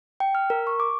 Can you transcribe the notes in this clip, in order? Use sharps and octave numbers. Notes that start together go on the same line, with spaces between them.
G5
F6
A#4
C#6
D6